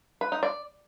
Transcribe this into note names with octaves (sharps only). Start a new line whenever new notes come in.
B4
D#4
D5